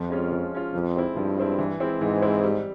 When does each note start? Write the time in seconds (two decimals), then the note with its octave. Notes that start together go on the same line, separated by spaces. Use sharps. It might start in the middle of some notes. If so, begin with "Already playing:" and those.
Already playing: F2 F3
0.10 G#3 C#4 F4
0.31 F3
0.52 G#3 C#4 F4
0.73 F2 F3
0.95 G#3 C4 E4
1.15 G2 F3
1.37 G#3 C4 E4
1.58 E3
1.80 G#3 C4 E4
2.01 G#2 E3
2.22 G#3 C4 E4
2.43 G3